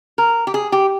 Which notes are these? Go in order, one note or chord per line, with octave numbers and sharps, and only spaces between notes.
A#4
G4
G#4
G4